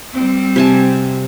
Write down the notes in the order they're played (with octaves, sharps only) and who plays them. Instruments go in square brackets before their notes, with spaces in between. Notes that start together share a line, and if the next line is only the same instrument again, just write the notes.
[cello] G3 C4
[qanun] C3 G#5 A5